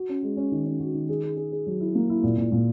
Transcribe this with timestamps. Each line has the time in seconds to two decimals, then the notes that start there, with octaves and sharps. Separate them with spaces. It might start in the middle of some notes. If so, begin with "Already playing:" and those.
Already playing: F#4
0.09 C#4
0.23 G#3
0.37 C#4
0.52 D#3
0.66 C#4
0.80 F#4
0.94 D#3
1.09 G#4
1.23 G#4
1.37 G#4
1.52 G#4
1.67 F#3
1.80 E4
1.95 A#3
2.10 E4
2.23 A#2
2.38 A#2
2.52 A#2